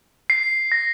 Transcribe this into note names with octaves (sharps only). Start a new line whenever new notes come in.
C7
A#6